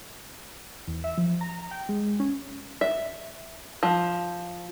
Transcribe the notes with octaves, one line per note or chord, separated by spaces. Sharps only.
E2
E5
F3
A#5
G5
G#3
C#4
E5
F3